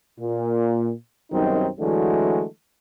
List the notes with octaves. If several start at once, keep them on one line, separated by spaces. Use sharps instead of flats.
A#2
B1 F#2 D#3 G3 C4 D#4
D3 E3 F#3 G#3 A3 F#4